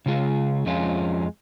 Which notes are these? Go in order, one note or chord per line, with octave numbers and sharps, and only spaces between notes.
C#3 G#3 F4 G#4
F2 F3 G#3 C#4 F4